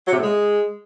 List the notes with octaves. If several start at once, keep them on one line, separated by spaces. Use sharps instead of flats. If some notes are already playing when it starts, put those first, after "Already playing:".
F#3
C3
A2
G#3